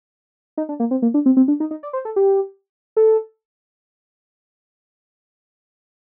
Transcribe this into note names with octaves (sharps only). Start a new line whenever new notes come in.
D#4
D4
A#3
C4
A#3
D4
C4
C4
D4
D#4
D#4
D5
C5
A4
G4
A4